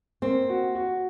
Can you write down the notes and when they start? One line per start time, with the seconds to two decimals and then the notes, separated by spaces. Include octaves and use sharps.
0.22 A#3 C4
0.50 F#4
0.75 F#4